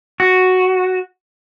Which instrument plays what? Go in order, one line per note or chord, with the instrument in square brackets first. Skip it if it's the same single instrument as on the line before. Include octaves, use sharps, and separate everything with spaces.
[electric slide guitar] F#4